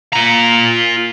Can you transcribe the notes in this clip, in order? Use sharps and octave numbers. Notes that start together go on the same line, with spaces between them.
F4 A#5